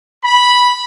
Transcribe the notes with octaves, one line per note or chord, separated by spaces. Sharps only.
B5